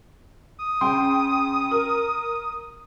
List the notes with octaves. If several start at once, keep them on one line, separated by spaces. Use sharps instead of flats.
D#6
C#3 G5 C6
A#4